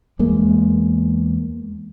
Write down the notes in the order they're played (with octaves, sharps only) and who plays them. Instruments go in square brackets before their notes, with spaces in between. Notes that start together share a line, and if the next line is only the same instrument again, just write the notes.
[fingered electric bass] E2 G#3 A#3